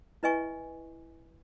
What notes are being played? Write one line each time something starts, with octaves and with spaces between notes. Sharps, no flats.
E4 B4 D#5 E5 G#5 C#6